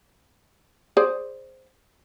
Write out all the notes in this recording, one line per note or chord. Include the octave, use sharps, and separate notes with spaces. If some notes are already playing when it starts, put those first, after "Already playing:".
G#4 C5 D5